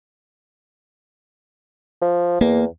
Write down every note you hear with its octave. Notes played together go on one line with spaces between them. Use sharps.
F3
E2 A#3